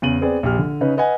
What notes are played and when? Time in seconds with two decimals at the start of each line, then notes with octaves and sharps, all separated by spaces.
0.02 E2 C#3 D#7 F#7
0.21 B3 C4 G#4 D5
0.43 A#1 G4 F6
0.59 D3
0.81 C#3 C#4 D#4 B4
0.97 B4 D#5 F#5 G#5